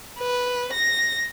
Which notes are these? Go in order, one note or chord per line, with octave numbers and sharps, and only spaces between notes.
B4
A#6